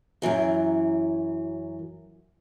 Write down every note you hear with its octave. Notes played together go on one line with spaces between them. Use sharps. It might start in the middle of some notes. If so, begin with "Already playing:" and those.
F#2 C3 E3 F#3